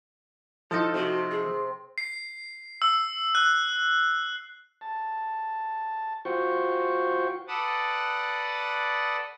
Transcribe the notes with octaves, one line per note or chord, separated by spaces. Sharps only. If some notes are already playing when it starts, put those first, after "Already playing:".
F3 D#4 E4 A4
C3 F#4
G#4
C7
E6
F#6
A5
F4 F#4 C5 G5 C#6
A4 B4 D5 F#5 A5 D#6